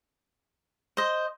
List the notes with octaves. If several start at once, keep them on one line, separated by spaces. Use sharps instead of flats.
C5 D#5